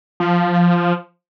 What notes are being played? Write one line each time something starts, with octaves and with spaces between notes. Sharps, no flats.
F3